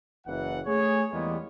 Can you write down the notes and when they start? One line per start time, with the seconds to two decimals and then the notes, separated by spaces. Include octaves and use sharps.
0.27 F#1 E3 F#5
0.66 A3 G#4 C#5
1.12 E2 E3 G3 G#3 A#3 B3